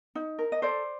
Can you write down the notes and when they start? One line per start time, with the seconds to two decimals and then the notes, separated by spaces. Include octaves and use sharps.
0.15 D#4
0.39 A#4
0.52 D#5
0.62 A4 C5 D5